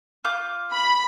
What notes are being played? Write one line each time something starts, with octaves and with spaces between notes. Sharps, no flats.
F4 D6 G6
B5